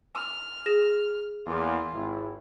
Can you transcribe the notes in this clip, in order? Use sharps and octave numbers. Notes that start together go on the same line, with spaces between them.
F6
G#4 A#6 E7
E2 A#3 F4
G#1 E4